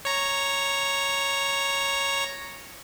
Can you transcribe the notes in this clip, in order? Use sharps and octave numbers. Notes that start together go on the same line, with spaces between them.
C#5 A#5